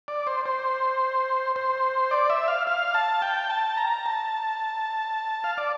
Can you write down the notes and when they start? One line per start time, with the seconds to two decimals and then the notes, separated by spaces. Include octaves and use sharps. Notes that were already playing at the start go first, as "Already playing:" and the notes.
0.08 D5
0.27 C5
0.46 C5
1.56 C5
2.11 D5
2.30 E5
2.48 F5
2.67 F5
2.94 A5
3.22 G5
3.50 A5
3.77 A#5
4.06 A5
5.44 F5
5.58 D5